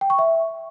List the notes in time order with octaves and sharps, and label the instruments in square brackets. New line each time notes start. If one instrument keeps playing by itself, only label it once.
[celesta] G5
C#6
E5